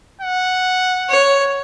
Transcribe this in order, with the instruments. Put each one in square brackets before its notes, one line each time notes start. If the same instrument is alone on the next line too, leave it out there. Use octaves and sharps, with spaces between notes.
[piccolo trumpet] F#5
[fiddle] C#5